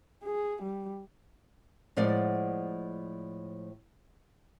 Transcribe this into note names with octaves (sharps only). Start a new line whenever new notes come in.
G#4
G3
A2 F3 G#3 D5 F#5